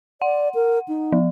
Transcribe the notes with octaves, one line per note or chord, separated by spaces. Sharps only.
D5 F#5
A#4
D#4
F3